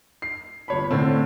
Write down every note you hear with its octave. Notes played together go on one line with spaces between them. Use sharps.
C7
G1 C#5 B5
A2 D3 A3 C4